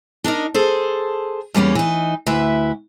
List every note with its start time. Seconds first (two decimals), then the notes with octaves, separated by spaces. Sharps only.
0.24 D4 D#4 A#4 D#5
0.54 G#4 A4 C5
1.54 E2 G3 A#3 C#4
1.75 E3 D#4
2.27 D2 E4 B4 E5